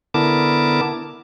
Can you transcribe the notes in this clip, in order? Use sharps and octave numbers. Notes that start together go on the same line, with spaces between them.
D3 B3 E4 A#4 A5 D6